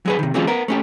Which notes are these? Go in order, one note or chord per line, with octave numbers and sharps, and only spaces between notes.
F#3 G#4 B4
C3 D#3
E3 F#3 G#3 C4 C#4 F4
B3 A#4
A3 C#4 G4